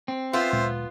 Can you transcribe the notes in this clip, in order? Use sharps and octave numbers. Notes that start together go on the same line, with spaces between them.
C4
B3 F4 C5 E5 C6
D1 A#2 G#3